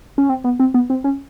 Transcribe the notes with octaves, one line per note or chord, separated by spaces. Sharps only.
C#4
C4
B3
C4
B3
C4
C#4